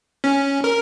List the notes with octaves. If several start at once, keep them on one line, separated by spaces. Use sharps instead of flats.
C#4
A#4